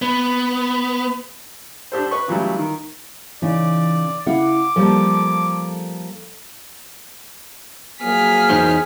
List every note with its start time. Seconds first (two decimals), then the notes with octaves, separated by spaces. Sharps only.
0.02 B3
1.92 D4 G4 A4 C5
2.11 B4 C#6
2.28 C#3 E3 F#3 G3 A3 E4
2.58 D#3
3.42 C#3 E3 D#4 D5
4.27 C#3 E4 F5 F#5 D6
4.76 F3 G3 A#3 A4
8.02 F3 F#3 A#3 G#4 F6 B6
8.50 E2 D#4 C5